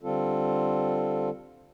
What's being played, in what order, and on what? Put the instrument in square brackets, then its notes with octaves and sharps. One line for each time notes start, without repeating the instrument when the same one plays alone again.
[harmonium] D3 G3 C4 F4 A4